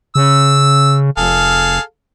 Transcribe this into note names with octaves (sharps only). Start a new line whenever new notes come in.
C#3 E6
F1 G#4 A4 F5